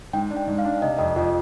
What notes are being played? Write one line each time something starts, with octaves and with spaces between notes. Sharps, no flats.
G#2 G5
D4
G5
G#2
F5
D4
C3 D#5
F2 D#5
F2 F4